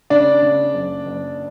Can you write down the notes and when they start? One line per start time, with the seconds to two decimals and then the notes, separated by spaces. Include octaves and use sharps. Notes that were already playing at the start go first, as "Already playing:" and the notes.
0.10 C#3 D4 D5
0.42 C#3
0.74 F#1
1.05 F#1